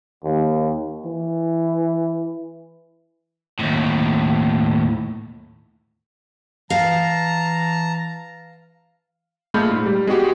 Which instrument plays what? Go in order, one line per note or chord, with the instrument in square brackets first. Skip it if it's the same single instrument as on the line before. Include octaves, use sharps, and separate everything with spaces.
[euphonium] D#2
E3
[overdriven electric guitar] D#2 A2
[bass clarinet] E3 [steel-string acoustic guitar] F5 [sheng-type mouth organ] A5 A#5
[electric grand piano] A#2 G#3 A3 B5 F6 G6
G#2
G3
G#3 B3 F#4 G4